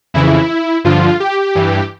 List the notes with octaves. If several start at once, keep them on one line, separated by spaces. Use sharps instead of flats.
F2 C#3 E3 E4
G2 D3 F3 F4
G4
G2 E3